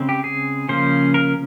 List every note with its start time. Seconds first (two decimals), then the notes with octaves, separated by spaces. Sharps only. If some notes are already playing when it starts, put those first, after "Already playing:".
Already playing: C#3 G#3 C4
0.09 G4
0.24 G#4
0.69 C#3 F3 A#3 C#4 C5
1.14 A#4